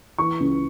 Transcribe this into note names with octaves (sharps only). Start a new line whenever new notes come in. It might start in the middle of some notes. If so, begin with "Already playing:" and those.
E3 C#6
C#2